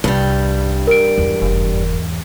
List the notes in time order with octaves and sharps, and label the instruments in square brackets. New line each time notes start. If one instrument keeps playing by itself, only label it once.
[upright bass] C2 [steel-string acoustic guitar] G2 G3
[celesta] A#4 D7
[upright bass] E2 G#2
[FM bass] F1